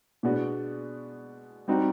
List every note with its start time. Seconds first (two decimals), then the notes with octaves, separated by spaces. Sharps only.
0.23 B2 G#3 B3 D4 F#4
1.68 G3 C4 D#4 F#4